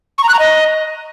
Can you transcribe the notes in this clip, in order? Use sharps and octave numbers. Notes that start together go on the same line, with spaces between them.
C#6
A#5
F#6
A#5
D#5